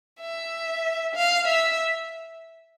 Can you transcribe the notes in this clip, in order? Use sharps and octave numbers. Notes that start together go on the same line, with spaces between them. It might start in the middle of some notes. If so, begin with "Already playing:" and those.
E5
F5
E5